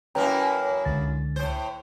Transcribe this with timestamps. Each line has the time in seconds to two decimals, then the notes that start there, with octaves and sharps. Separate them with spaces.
0.15 F#2 A#3 E4 B4 G5 A#5
0.85 C#2 D3 A6
1.36 A2 C5